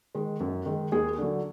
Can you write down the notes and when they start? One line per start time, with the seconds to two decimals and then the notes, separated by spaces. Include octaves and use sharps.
0.15 D#3 G#3
0.40 F#2
0.66 D#3 G#3
0.92 D#2 G#4
1.18 D3 F#3